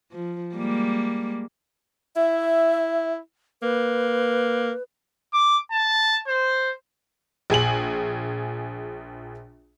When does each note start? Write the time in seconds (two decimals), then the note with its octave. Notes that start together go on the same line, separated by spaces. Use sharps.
0.12 F3
0.54 G3 G#3 A#3
2.16 E4 E5
3.63 A#3 B4
5.34 D6
5.71 A5
6.27 C5
7.50 A#1 G#4 G#5 F#7